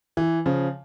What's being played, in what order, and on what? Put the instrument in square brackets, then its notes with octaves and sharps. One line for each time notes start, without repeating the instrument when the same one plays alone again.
[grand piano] E3
C#3 F3